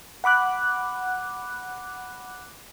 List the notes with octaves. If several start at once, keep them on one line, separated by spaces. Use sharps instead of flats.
F#5 B5 D6 F#6